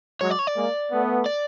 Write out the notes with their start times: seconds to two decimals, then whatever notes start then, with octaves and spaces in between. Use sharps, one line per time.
0.21 F#3 G#3 C#5
0.30 D5
0.39 C#5
0.47 D5
0.56 G#3 A#3
0.91 A3 B3
1.26 D5